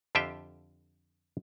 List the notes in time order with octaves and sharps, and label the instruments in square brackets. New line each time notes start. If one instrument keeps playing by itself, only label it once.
[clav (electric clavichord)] F2 D3 F4 G4 E5 G5